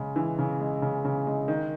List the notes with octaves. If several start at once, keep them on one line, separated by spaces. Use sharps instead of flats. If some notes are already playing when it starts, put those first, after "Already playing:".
Already playing: C#3 G#3
E3
C#3
G#3
C#3
C#3
G#3
D#3